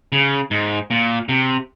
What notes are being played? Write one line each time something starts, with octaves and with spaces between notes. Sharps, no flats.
C#3
G#2
A#2
C3